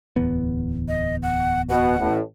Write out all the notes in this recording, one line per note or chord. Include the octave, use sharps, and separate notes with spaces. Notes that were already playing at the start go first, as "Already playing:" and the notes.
D1 E2 B3
D#5
F#5
B2 F#5
A1 A2